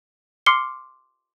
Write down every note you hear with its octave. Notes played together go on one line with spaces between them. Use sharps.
C6 D6 F6 C7 C#7 G7